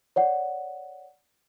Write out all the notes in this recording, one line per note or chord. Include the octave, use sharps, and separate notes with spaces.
C#5 D5 F#5